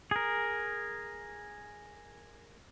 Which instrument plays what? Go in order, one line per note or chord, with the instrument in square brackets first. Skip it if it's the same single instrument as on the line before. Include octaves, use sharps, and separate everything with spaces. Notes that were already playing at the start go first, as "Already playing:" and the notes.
[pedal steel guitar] G#4 A#4